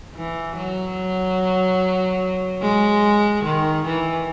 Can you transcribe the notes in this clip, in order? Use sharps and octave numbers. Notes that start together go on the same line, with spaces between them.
E3
F#3
G#3
D#3
E3